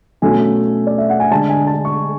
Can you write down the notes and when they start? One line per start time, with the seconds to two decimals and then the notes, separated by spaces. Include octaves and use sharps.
0.22 B2 F#3 A3 C#4 G#5
0.87 D5
0.98 E5
1.09 F#5
1.20 G#5
1.31 D3 G#3 D4 A5
1.50 G#5
1.67 A5
1.85 C#6